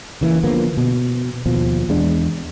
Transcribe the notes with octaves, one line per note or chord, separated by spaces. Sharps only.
C#3 E3 A#3
D3 F3 A#3 B3
B2
D#2 B2 F3
E2 G#3 D4